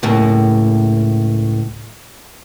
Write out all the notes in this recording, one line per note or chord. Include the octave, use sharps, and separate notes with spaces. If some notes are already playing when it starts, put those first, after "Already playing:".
C#2 A2 A#3